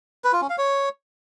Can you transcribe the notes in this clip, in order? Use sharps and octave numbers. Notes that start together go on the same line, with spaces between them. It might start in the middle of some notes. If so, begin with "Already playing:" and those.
B4
F4
C#4
F5
C#5